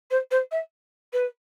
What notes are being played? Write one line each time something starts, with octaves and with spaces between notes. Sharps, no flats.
C5
C5
E5
B4